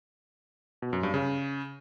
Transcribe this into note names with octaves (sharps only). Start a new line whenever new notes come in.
B2
F#2
G2
C#3